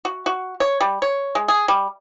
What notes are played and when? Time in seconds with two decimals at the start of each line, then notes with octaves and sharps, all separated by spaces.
0.05 F#4
0.26 F#4
0.60 C#5
0.81 G3
1.02 C#5
1.35 G#3
1.48 G#4
1.68 G3